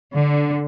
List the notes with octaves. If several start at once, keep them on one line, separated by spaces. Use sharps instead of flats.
D3